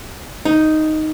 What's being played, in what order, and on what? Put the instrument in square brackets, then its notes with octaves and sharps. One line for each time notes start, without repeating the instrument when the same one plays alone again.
[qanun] D#4